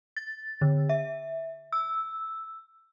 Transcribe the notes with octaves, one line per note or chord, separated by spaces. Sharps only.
A6
D3
E5
E6